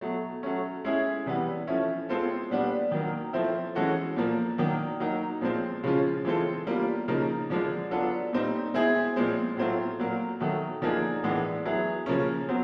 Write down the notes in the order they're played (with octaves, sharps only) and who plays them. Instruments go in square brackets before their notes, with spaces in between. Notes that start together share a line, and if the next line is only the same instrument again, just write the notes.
[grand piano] B2 F#3 A3
F#3 A3 C#4
G#3 C#4 E4 G#4
C3 E3 G3 B3
F3 A3 C#4 E4
B2 G#3 C4 F4 A4
A#2 G3 B3 D4
D#3 F#3 A#3
F3 A3 C4 E4
E3 G#3 C#4 F#4 A4
A#2 F3 A#3
D#3 F#3 A#3 D4
F#3 A#3 D#4
A#2 F3 G#3 C4
C#3 F3 G#3 C#4 F4
E3 G#3 C4 F4 A4
B2 G3 A#3 D4 F4
C#3 F3 A#3 D#4
D3 F3 G#3
F#3 B3 D4 F4 A4
A#2 G3 C4 D#4
B2 G#3 C4 E4 G#4
A#2 F3 G#3 C4
A2 F#3 A3 C4 F4
A#2 F#3 A#3
D#3 F#3 A3
D3 F3 A#3 D#4 G#4
A2 E3 G#3 B3 D4
F#3 B3 E4 G#4
C#3 F3 A#3 C#4
B2 F#3 C4